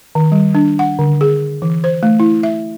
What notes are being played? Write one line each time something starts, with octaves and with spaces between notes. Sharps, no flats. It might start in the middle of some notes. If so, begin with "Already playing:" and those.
D#3
G3
D4
F#5
D3
G#4
E3
C5
A3
E4
E5